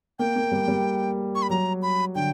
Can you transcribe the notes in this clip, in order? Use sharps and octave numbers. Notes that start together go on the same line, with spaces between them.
A#3 G5
A#3
G3
G3
C#6
B5
F#3 A#5
B5
D3 G5